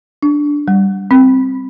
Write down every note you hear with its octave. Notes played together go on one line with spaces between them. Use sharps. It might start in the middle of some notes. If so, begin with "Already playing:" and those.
D4
G3
C4